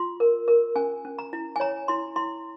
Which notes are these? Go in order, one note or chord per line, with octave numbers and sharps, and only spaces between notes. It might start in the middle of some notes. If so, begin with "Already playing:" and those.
Already playing: F4 C6
A#4
A#4
C#4 G#5
C#4
A#5
E4
G#5
C#5 A#5
E4 C6
E4 C6